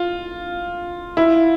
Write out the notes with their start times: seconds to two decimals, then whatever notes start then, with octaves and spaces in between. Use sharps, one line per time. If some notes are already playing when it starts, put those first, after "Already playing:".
Already playing: F4
1.17 E4